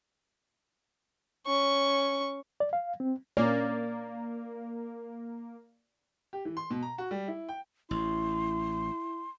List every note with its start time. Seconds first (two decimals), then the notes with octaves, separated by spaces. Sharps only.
1.46 C#4 C#6
2.60 D5
2.73 F5
3.00 C4
3.37 A#2 A#3 C#4 A#4 D5
6.33 G4
6.45 E3
6.57 C6
6.71 B2
6.83 A#5
6.98 F#4
7.11 G3
7.28 E4
7.49 G5
7.91 A1 E4 C6